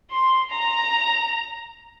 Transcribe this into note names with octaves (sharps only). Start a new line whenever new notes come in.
C6
A#5